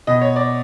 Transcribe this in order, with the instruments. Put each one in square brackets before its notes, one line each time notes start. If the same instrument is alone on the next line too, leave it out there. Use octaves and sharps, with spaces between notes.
[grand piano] B2 D#5
C#5
D5